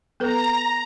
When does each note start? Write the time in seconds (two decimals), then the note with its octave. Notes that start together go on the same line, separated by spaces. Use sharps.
0.20 B3 A4 B4 A#5